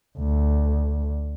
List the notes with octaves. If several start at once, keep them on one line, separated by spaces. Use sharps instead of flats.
D2